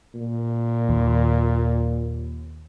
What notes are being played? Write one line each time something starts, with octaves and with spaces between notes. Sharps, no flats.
A#2
D#2